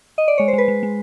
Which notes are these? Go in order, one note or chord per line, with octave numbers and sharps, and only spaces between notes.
D#5
D5
G#3 C#5
C5
G#3
B4
G#3
G#3